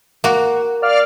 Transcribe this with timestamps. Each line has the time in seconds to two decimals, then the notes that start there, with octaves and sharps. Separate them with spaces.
0.24 A#3 F#4
0.82 D5 F5 F6